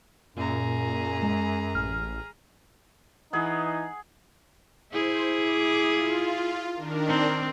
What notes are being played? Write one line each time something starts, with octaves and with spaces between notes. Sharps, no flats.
F#2 A#2 G#4 A#5
G#3
A1 F6
E3 D#4 G#4 F#5
E4 G#4 C5
D6
F4
D#3 D4 A#4
C4